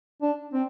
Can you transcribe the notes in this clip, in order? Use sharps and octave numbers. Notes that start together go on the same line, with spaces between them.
D4
C4